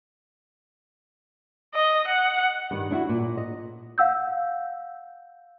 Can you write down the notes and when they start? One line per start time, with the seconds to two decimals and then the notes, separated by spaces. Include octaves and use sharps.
1.75 D#5
2.08 F#5
2.71 G2 D#3
2.91 D4 E4 F#4
3.09 A#2
3.37 D#5
3.98 F5 F#5 E6 G6